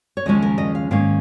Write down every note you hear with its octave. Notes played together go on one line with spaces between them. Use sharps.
C#5
D#2 C#3 F3 G#3 C#4 D#5
A#4
D#5
F5
G#2 D#3 A#3 C#4 F5